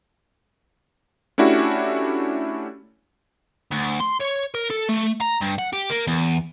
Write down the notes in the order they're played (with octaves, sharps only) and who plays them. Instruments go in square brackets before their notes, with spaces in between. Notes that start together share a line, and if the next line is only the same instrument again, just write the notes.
[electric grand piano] A3 C#4 D4 E4 F#4 G4
[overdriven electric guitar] D2
C6
C#5
A#4
A4
A3
A#5
G2
F#5
G4
A#3
E2